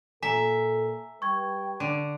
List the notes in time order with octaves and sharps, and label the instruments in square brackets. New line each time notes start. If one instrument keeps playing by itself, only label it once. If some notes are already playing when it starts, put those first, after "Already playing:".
[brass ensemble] A#2 A4 [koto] E5 [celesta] G#5 A#5
[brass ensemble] G3 B4 G5 [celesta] C#6 G#6
[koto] D3